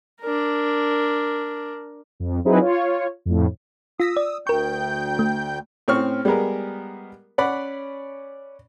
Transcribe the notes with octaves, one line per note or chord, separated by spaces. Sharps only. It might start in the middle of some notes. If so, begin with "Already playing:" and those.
D4 A#4
F2
F#3 C4 D#4 E4 G#4 B4
F4 C#5
F2 A2
F4 D#6 E6 A#6 B6
D5
D2 A#4 G5 C#6 G6
A3
A2 C4 C#4 C#6 F6
G3 G#3 B3 G#4 A#4
C#4 D5 F#5 B5